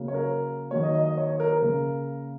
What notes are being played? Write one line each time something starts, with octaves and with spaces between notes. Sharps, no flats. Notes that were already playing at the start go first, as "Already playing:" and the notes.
Already playing: C#3 F#3 A#3
C#5
A#4
D#3 F#3 A#3 C#5
D#5
D#5
D#5
C#5
C#5
A#4
A#4
C#3 A#3